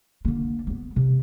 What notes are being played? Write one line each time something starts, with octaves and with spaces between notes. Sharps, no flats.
D3 A#3
A#3 B3
C3